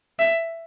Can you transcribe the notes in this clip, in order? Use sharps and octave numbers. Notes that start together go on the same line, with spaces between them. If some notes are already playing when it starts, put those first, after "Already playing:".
E5